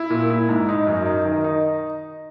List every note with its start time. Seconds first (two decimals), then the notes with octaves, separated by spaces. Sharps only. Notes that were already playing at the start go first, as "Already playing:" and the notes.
Already playing: E4
0.10 A#2
0.30 E4
0.49 G#2
0.69 D#4
0.87 F#2
1.06 D#4
1.25 D#3
1.44 D#4